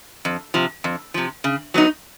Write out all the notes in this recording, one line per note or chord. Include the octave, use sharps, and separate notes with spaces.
F2
C3 F3
F2
C3 F3
C#3
F#3 B3 D#4